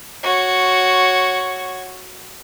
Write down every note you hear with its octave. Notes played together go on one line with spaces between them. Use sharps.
F#4 C#5